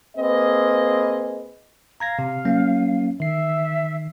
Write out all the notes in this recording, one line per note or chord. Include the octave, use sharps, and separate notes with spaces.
A#3 C4 G#4 B4 D#5
F5 A#5 G#6 A#6
C3
F#3 A#3 C#4
D#3 E5 C7